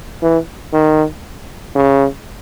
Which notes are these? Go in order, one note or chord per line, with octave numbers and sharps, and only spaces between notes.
E3
D#3
C#3